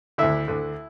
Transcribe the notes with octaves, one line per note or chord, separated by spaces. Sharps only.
D2 D3 E4 E5
D2 D3